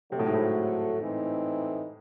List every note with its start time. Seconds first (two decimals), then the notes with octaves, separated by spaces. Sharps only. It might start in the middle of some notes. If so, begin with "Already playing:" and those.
0.12 C3 F#3 A3 C4 F#4 A4
0.19 A2
0.26 G#2
0.34 A2
1.00 A2 E3 A3 C4 D#4